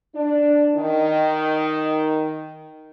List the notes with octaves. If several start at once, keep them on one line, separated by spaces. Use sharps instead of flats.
D4
D#3